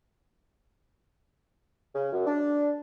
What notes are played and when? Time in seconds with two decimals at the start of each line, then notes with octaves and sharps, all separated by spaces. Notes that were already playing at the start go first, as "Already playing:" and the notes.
1.95 C#3
2.13 F#2
2.26 D4